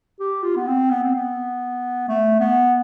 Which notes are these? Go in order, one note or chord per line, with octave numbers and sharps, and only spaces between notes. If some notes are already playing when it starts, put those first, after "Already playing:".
G4
F4
B3
C4
B3
C4
B3
A3
B3